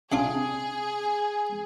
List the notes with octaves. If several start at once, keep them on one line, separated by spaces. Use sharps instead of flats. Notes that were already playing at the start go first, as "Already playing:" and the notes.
C3 D4 F4 G#4